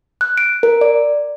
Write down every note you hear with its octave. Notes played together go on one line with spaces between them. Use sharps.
F#6
D7
A#4
D5